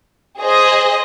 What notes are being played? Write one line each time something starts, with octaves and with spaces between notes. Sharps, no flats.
G#4 C5 D#5